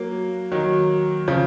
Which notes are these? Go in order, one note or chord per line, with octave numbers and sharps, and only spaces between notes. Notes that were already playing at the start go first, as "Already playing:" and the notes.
Already playing: F#3 A#3
D#3 F#3
C#3 F3